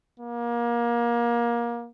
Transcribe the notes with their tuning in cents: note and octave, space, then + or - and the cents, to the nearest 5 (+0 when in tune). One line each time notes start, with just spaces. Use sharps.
A#3 +25